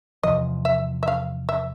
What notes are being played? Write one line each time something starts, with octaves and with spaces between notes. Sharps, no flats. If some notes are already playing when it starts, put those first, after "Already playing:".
E2 C3 F3 D#5
E5
E5
F5
E5